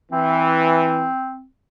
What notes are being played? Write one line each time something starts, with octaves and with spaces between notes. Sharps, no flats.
E3 C4